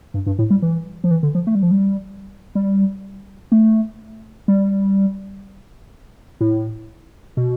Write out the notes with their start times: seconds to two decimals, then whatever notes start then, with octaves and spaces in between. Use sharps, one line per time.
0.14 G2
0.26 G2
0.39 A2
0.50 G3
0.62 E3
1.04 F3
1.11 E3
1.23 D3
1.35 F3
1.47 A3
1.55 G3
1.62 F3
1.71 G3
2.55 G3
3.52 A3
4.48 G3
6.40 A2
7.37 B2